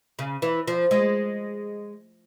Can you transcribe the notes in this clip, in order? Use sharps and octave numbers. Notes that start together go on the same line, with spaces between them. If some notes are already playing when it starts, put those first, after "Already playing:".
C#3
E3
F3
G#3